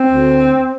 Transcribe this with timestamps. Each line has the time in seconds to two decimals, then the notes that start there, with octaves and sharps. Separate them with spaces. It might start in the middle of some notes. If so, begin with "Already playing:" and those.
Already playing: C4
0.09 D2